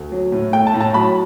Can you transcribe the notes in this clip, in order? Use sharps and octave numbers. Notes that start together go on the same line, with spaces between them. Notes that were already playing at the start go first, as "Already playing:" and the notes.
Already playing: D2
F#3
A2
A3 G5
A5
A2
A5
F#3 B5